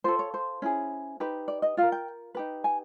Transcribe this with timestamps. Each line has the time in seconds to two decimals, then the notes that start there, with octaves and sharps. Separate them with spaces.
0.04 F4 A4 C5
0.19 C#5
0.34 C5
0.62 C#4 E4 G#4
1.20 D#4 G4 B4
1.48 D5
1.62 D#5
1.77 F4 A#4 F5
1.92 G5
2.35 D#4 G4 B4
2.64 G#5